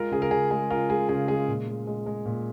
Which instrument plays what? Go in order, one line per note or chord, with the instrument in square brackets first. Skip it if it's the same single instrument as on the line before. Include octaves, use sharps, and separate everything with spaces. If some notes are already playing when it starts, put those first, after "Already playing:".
Already playing: [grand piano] G#3 F4 A#4
C#3 G#4
A#4
C#3 G#4
G#3 G#4
C#3 F4 A#4
G#3 G#4
C#3 G#4
G#3 G#4
A#2
G#3
G#3
G#3
A#2